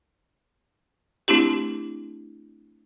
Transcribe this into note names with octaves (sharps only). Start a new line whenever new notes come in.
A3 C4 D4 E4 G4